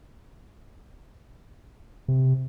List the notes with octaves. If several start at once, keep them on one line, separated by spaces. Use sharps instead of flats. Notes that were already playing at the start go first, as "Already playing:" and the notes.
C3